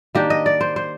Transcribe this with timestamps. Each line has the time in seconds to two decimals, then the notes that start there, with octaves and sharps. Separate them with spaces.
0.15 D#3 A#3 D4 G4
0.30 D#5
0.46 D5
0.61 C5
0.76 C5